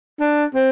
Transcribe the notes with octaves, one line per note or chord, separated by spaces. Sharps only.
D4
C4